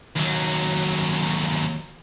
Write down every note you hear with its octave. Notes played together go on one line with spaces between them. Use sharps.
D#2 F#3